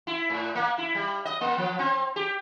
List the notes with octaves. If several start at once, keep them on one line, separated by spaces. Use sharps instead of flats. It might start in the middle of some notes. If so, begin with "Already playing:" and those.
E4
A2
A#3
E4
G3
D#5
A#3
F3
C4
G4